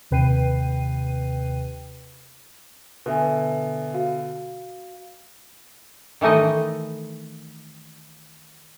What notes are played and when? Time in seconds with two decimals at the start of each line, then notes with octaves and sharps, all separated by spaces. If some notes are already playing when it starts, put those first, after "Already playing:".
0.11 D#2 C3 B4 G5 C7 D#7
3.06 B2 D3 B4 E5 G#5
3.94 F#4 F5
6.21 D#3 E3 A3 D#4 D#5